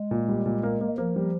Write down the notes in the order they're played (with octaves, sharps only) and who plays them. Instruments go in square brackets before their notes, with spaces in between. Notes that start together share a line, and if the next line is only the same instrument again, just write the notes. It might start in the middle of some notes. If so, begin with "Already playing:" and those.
Already playing: [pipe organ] G#3
[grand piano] A#2
G3
A#2
A#3
A#3
[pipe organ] F3 [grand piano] A#3
[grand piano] G3